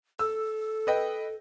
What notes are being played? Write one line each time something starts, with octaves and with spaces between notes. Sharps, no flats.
A4 E6
B4 D#5 G5